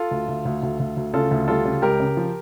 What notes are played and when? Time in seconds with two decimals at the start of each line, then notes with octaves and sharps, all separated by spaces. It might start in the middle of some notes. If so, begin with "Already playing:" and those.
Already playing: F4 A4
0.11 D2
0.28 D2
0.45 D2
0.63 D2
0.80 D2
0.97 D2
1.14 C#3 F4 A4
1.31 D2
1.48 G3 F4 A4
1.65 C#3
1.82 C#2 G4 A#4
2.00 C#3
2.17 F3